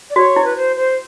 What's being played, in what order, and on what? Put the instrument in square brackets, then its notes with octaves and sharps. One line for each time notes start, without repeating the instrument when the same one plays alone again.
[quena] D5
[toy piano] F#4 [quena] C#5
[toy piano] E4
[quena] B4
C5
C5